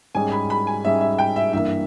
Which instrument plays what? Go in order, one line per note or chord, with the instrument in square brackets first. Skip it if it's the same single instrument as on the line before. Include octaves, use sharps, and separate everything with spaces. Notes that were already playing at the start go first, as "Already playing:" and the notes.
[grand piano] G#2 G3 C#4 G#4 [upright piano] G#5
[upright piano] B5
B5
G#5
[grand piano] G#2 G3 C#4 G#4 [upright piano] E5
[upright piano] E5
G5
E5
[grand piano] G2 E3 A#3 [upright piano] E5